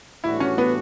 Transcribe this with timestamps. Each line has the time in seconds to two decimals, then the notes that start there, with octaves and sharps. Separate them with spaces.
0.24 A2 E3 G3 D4 E4 F#4
0.40 C#4
0.58 B3